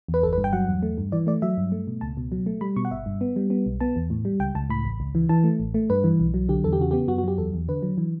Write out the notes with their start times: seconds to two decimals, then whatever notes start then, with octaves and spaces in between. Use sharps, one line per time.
0.08 E2
0.14 B4
0.23 G1 A4
0.33 B4
0.38 G2
0.44 G5
0.53 F#3 F#5
0.68 E2
0.82 A3
0.98 G2
1.12 E3 D5
1.27 A3 D5
1.42 F#3 E5
1.57 G2
1.72 A3
1.87 B2
2.01 C#2 A5
2.17 B2
2.32 F#3
2.46 A3
2.61 G3 B5
2.76 B2 C#6
2.85 F#5
2.91 G1 E5
3.06 G2
3.21 B3
3.36 G3
3.50 B3
3.66 B1
3.80 B3 A5
3.96 E2
4.10 A2
4.25 G3
4.40 C#2 G5
4.55 C#2 A5
4.70 A2 B5
4.85 A1
5.00 C#2
5.15 E3
5.29 E3 A5
5.44 A3
5.60 A1
5.74 A3
5.90 G2 B4
6.04 E3
6.20 B1
6.34 F#3
6.49 D3 G4
6.64 E2 A4
6.73 G4
6.78 C#3 F#4
6.91 B3 G4
7.08 F#2 F#4
7.18 F#4
7.23 F#3 G4
7.38 E2 A4
7.54 E2
7.68 D3 B4
7.82 F#3
7.98 E3